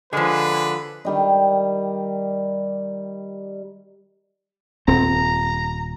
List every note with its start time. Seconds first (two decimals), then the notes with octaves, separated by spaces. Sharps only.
0.13 D3 F3 G#3 G#4 B4
1.05 D#3 G3 D#5
4.88 D#1 C4 A#5